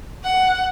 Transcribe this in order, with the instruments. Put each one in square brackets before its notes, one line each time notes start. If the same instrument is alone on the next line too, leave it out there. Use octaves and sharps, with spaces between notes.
[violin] F#5